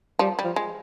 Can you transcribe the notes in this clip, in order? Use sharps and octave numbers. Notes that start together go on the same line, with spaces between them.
F3 G3
G3
F3
G#3